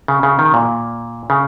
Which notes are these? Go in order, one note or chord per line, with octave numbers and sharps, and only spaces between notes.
C#3
C#3
D#3
A#2
C#3